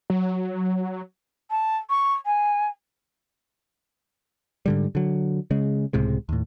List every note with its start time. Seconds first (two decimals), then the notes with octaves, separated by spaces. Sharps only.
0.10 F#3
1.50 A5
1.90 C#6
2.25 G#5
4.66 G#2 D3 G3
4.95 D3 F#3
5.51 C#3 G#3
5.93 C#2 A2 C3 G#3
6.29 D#2 A2